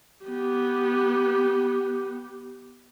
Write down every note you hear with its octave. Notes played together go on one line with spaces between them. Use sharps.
B3 G4